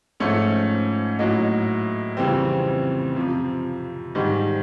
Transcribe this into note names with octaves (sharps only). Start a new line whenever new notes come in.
G#2 F3 A3 C#4
A2 F#3 A#3 D#4
F2 C#3 E3 G3 C4
F2 C3 F3
G#2 D#3 G3